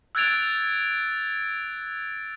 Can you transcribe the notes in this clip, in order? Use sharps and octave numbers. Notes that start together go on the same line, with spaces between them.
E6 F#6 G#6 A6 D7 F7